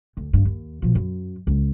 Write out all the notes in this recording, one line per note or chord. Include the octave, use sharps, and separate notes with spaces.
D2
F#1 G2
D#2
B2 F3
F#2
C#2